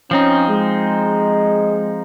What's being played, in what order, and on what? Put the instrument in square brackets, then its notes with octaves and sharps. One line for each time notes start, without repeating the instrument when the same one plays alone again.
[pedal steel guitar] F3 C4 D#4 [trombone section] C#4
[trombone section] G#3